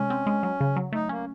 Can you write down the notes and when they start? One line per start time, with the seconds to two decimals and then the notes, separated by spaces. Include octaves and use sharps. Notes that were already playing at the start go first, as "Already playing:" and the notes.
Already playing: C3 G#3 C#4
0.10 C4
0.26 G#3
0.43 F#3
0.61 C#3
0.76 F#3
0.92 A3 D#4
1.09 A#3 C#4